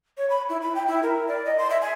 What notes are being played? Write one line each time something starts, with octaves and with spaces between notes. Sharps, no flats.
C#5
B5
E4
B5
G5
E4
A#4
D5
D#5
C6
E5
G#5